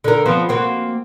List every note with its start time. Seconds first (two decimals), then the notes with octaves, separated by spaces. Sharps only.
0.04 D3 A#4
0.26 F3 B3 C4
0.49 A#3 C4 F#4